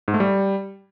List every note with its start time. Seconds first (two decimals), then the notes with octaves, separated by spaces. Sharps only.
0.08 G#2
0.14 A3
0.20 G3